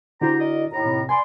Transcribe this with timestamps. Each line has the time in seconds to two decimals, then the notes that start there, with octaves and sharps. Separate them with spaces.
0.21 D3 E4 F#4 G4 C5 A#5
0.39 A#4 D5 D#5
0.72 D#2 A2 A#5
0.85 C3
1.09 B4 D5 G#5 C6